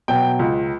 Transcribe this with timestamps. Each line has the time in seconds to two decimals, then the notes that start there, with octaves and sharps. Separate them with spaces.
0.08 B2 F#3 G5
0.39 C#2